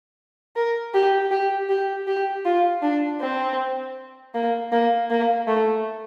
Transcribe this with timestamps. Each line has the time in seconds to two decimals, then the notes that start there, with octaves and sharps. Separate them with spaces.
0.56 A#4
0.94 G4
1.31 G4
1.69 G4
2.07 G4
2.45 F4
2.82 D4
3.20 C4
4.34 A#3
4.72 A#3
5.10 A#3
5.47 A3